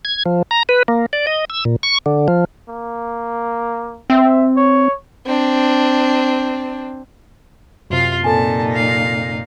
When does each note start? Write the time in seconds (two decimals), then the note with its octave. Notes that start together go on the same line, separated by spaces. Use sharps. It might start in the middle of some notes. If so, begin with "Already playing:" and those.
0.05 G#6
0.26 F3
0.51 A#5
0.69 B4
0.88 A#3
1.13 D5
1.27 D#5
1.50 E6
1.65 A#2
1.83 C#6
2.06 D3
2.28 F3
2.68 A#3
4.10 C4 E5
4.56 C#5
5.26 C4 D4
7.90 F#2 C3 F4 F5
8.24 A#2 D#4 A4 G#5 A5
8.75 F5